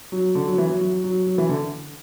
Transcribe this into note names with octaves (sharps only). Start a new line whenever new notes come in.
F#3
D3
F#3
E3
F#3
F#3
F#3
F#3
E3
D3